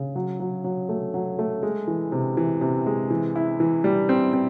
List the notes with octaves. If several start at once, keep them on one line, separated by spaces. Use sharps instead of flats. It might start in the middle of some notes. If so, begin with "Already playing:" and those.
Already playing: C#3
F#3
F#3
F#3
A3
F#3
A3
G#3
E3
C3
E3
C3
G#3
E3
E4
E3
G3
C4
C4